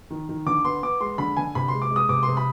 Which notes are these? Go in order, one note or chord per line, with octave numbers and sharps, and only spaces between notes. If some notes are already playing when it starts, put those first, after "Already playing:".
D#3
D#3
D3 D6
B3 C6
B3 D6
G#3 C6
D3 B5
D3 G#5
C3 B5
G#3 C6
D6
G#3
D#6
C3 D6
C3 C6
B5